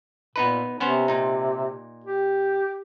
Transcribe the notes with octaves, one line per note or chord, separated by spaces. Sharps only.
A#2 B3 D#4 B4
C3 B3 C#4 C5
A#2 D#4
G4